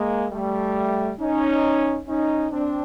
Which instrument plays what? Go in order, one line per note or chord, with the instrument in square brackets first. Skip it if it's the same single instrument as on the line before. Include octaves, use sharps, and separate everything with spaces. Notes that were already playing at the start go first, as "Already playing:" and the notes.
Already playing: [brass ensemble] G#3 A#3
G3 A3
C#4 D#4
C#4 D#4
C4 D4